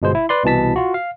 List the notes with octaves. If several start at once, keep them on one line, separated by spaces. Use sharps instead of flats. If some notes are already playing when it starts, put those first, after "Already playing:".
G1 B2 G#3 C5
E4
B4 D5 C6
C2 B2 E3 A5 B6
F4 F#4
F5